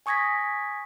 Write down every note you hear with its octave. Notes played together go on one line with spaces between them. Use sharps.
G#5 C#6 D#6 G#6 A#6 B6